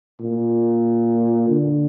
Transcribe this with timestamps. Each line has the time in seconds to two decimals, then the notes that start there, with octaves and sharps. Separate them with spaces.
0.21 A#2
1.49 D3